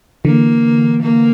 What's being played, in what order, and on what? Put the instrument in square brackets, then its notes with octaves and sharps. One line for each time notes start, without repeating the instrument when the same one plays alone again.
[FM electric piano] D3 E3 [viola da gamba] A#3
[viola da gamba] A#3